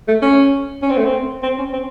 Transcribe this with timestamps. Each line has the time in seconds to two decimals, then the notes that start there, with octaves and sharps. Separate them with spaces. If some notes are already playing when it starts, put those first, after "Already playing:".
0.08 A3
0.22 C#4
0.82 C#4
0.90 C4
0.97 A3
1.05 C4
1.43 C4
1.58 C#4
1.73 C4